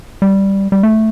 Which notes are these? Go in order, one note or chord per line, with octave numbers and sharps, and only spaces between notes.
G3
G3
A3